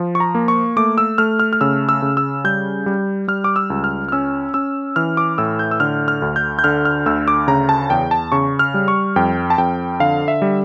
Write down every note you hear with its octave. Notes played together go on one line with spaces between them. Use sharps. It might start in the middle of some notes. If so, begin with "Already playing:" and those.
Already playing: F3
C#6
A#5
A#3
C#6
A3 D6
E6
A3 F6
F6
F6
C#3 E6
E6
C#3
E6
G3 G6
G3
G3 F6
D6
E6
C#2
F6
F6
C#4 E6
C#4 E6
E3 F6
D6
A2 E6
G6
E6
D3 F6
F6
D2
G6
G6
D3 F6
F6
D2 E6
D6
C#3 A#5
A5
E2 G5
A5
C#3 C#6
F6
G3
C#6
F2 G5
A5
F2 G5
D3 F5
E5
G3